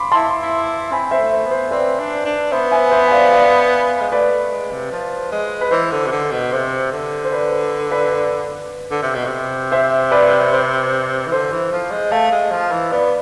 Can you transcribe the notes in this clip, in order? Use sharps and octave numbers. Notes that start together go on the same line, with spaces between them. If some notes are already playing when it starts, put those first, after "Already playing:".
Already playing: B5 C6 D6
E4 A5 C6
E4
C4 G#5 B5
C5 E5
A3
C5
B3
C5
C4 B4 D5
D4
D4
B3 C5 E5
E5 G#5
C5 E5
G#5
D5 F5
D5 F5
G#3
A3 B4 D5
A3
G#3
C3
F3
G#3
B4
E3 C5
D3
C3
D3
B2
C3 C5
D3
C5
B4 D5
B4
B4 D5
B4 D5
D3
C3
B2
C3
C5 E5
B4 D5
C5
E3
D3 C5
E3
F3
G#3
A3 F5 A5
G#3
F3
E3
B3 B4 D5